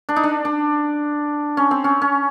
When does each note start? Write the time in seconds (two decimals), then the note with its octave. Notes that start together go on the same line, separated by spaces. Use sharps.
0.09 D4
0.16 D#4
0.23 D4
0.45 D4
1.57 C#4
1.71 C4
1.84 C#4
2.02 C#4